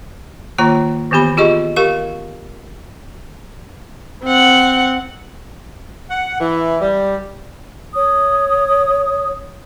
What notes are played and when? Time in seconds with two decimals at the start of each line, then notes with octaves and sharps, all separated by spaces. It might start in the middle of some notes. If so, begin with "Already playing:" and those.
0.58 D#3 A#3 F4 C#5 A#5
1.11 D#3 E3 B3 G4 B5
1.37 F4 G4 G#4 D#5 C#6
1.76 G4 A#4 F5 C#6
4.24 C4 F#5
6.11 F#5
6.40 E3
6.82 G3
7.93 C#5 D#6